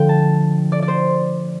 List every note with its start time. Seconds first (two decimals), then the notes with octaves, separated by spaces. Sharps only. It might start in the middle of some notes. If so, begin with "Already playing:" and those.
Already playing: D3 F3 A3 G5
0.09 A5
0.72 D5
0.82 D5
0.88 C5